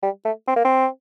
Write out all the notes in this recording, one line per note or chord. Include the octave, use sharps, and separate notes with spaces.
G3
A3
C4
A#3
C4